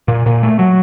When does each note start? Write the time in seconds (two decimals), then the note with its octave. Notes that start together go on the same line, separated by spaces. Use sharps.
0.08 A#2
0.26 A#2
0.43 A3
0.59 F#3